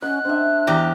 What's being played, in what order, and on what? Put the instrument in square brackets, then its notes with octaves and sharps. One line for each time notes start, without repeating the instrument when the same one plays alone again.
[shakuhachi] C#4 [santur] D#5 F#5 [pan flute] F#6
[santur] C4 E5 [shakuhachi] D4
[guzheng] E2 G4 A#5 [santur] D5